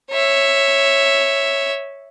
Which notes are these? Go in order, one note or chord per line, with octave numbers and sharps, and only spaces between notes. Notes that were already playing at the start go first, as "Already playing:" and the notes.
C#5 E5